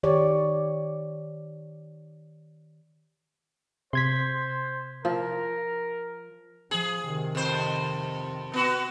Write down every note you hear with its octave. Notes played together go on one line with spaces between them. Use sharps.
D#3 G4 C#5 D5
C3 C5 C6 G#6 B6
F3 A#4
F3 G#4
C3 D#3
F2 C5
B3 F#4